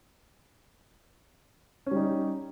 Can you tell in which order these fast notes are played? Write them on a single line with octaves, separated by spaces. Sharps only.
C#4 G3 D#4